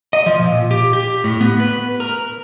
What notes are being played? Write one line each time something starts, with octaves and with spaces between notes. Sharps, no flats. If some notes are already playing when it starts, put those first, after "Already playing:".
D#5
F3
A#2
G4
G4
A2
B3
B4
A#4